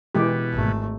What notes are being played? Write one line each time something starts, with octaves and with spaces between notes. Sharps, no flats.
B2 E3 G#3 G4
G#1 A3